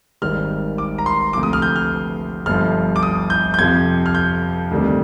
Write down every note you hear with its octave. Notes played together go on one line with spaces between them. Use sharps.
G#1 G#2 D#3 G3 F6
D6
A#5
C6
D2 C3 F3 D6
D#6
F6
G6
F6
G1 G2 F3 F6
D6
D#6
G6
G6
F2 C3 F3 G#6
F6
G6
D2 C3 D#3 G3